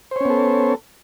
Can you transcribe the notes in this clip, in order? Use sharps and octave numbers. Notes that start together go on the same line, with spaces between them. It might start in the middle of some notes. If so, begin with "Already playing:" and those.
B3 C#4 A4 C5 C#5